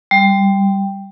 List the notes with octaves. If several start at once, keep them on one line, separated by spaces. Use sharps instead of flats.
G3